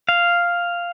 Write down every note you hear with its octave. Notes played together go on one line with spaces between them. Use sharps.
F5